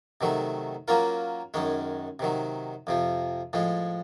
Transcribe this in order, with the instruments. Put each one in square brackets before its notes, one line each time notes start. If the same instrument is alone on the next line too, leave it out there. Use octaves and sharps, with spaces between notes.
[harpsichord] C3 D#3 F#3 A3
F#3 A#3 C#4 F4 A#4
F#2 D#3 G#3 C#4
C3 D#3 F#3
F2 C3 F3
A2 F3 G#3